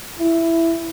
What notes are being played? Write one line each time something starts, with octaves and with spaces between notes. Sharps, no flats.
E4